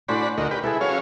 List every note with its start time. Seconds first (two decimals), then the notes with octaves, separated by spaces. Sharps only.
0.08 A2 C#4 D4 F#4 C5 B5
0.38 D2 D#4 F#4 A#4
0.51 G4 B4
0.63 E4 G#4 A4 B4
0.81 F#3 C#4 F5